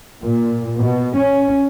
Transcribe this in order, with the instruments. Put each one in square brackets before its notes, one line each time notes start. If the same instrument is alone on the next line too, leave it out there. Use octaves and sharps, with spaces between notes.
[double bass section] A#2
B2
C#4